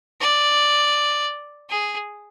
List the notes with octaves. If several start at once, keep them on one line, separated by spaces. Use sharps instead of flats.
D5
G#4